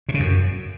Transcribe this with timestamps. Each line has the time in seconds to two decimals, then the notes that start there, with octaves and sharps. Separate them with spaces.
0.09 C3
0.14 C#3
0.20 F#2